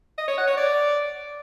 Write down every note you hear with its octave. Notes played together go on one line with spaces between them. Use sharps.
D#5
C#5
F#5
C#5
D5